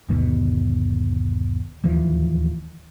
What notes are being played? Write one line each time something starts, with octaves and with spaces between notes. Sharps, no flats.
G1 D#2 B2
D1 D#2 E3 F3